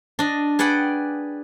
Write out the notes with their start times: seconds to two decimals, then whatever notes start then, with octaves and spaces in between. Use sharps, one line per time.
0.19 D4 D#5
0.59 G#4 B4 D5 F#5 G5